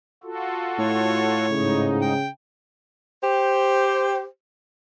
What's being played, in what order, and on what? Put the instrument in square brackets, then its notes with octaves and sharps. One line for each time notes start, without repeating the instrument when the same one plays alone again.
[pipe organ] F4 F#4 A4
[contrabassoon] A2 [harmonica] C#5
[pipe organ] G#2 D#4 [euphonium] C#3
[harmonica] G5
[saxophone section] G4 C5